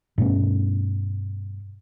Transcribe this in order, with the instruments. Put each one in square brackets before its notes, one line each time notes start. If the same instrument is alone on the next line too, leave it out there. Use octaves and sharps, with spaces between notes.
[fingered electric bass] G2 B2 A3 C#4